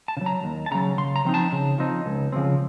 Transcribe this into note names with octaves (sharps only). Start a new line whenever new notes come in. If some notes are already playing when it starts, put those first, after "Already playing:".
A5
C#3
F#3
A#5
D#2
A5
C#3 F#3 A#5
C#3 C6
A#5
F3 C4 D#4
A5
C#3
F3 C4 D#4
C#2
C#3 F3 A3 C4